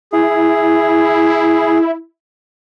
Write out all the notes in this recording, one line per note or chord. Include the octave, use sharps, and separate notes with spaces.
E4 G#4